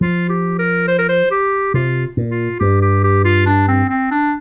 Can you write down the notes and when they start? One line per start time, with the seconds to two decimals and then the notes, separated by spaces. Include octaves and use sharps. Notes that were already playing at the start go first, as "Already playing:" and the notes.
0.01 F3 F4
0.29 G4
0.59 A#4
0.88 C5
0.99 A#4
1.09 C5
1.31 G4
1.74 C3 F4
2.17 A#2
2.31 F4
2.60 G2 G4
2.82 G4
3.04 G4
3.24 F4
3.46 D4
3.68 C4
3.90 C4
4.11 D4